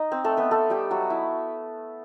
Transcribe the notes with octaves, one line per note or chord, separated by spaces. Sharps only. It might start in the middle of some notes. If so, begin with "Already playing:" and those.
Already playing: D#4 D#5
C4 C5
A3 A4
B3 B4
A3 A4
G3 G4
F#3 F#4
E4